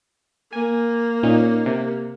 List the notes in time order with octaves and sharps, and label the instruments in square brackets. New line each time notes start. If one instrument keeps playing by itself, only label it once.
[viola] A#3 [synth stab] G#5
[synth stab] A#2 C#4 D#4
C3